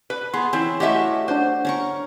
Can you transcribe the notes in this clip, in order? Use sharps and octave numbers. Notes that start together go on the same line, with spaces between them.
B4
B3 G#4 C6
E3 C4 C#4 E5
A3 C#4 F#4 G4 D#5 E5
D4 C5 F#5
C#4 A#4 C#6